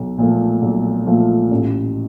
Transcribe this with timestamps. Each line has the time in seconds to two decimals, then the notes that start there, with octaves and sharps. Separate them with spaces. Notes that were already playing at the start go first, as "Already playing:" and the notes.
Already playing: B1
0.18 A#2 F3 A3
0.62 B1
1.06 A#2 F3 A3
1.51 A1